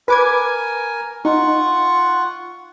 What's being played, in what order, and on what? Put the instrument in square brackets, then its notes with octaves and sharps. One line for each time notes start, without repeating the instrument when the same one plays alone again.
[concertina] A#4 G#5 [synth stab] B4 D6 G#6
[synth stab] D#4 [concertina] F4 F#5 C#6